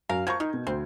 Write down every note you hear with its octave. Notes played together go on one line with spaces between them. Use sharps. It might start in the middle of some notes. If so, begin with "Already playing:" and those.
F#2 A#4 F5
F3 A#3 C#6 G6 G#6
D#3 D#4
B2
D2 C4